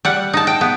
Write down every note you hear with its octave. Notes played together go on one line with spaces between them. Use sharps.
G3 F#5
D#4 A5
G5
B3